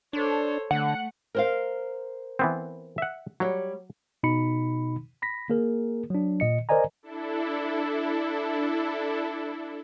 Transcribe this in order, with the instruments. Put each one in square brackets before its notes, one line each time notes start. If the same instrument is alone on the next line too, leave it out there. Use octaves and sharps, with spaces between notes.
[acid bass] D4 [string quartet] A4 C5 C#5
[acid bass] D3 [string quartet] A3 [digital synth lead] F#5
[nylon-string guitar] A#4 C5 F5
[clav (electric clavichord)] E3 B3 C4
E5 F#5
[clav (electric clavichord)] F#3 [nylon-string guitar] G3 C#5
[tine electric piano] B2 D#4 B5 C#7
B5 A#6 B6
A#3 G#4 A#4
F#3 D4
A#2 D#5 C#7
A#4 C5 D5 D#5 G#5 A#5
[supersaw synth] D4 E4 A4